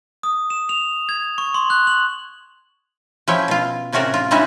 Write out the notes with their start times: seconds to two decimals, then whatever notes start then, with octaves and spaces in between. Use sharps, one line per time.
0.23 D#6
0.50 E7
0.69 F7
1.09 G#6
1.38 C#6
1.54 C6
1.70 F#6
1.87 F#7
3.28 F3 C#4 E4 C#5 G5
3.48 B2 F4
3.92 A2 C3 C#4 F#4 A#4 D5
4.14 F4
4.31 G3 G#3 C#4 D#4 E4 F#4